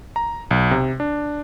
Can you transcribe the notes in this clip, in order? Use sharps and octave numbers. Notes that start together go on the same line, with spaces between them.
A#5
B1
C3
D4